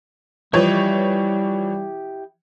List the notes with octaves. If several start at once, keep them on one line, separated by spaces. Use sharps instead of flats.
E3 F3 G3 E4 G4 C#5 D#5